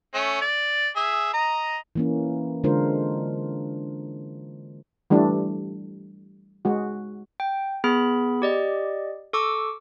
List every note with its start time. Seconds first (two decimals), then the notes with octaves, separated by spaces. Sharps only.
0.14 A3 C#4
0.41 D5
0.96 G#4 E5
1.33 D#5 A#5
1.95 E3 A#3 C#4
2.64 D3 G#3 D4 F4 A#4 C5
5.10 E3 G3 A3 D4
6.65 G#3 F#4
7.40 G5
7.84 B3 G#4 B5
8.42 G4 D5 D#5
9.33 A4 C#6 D6 E6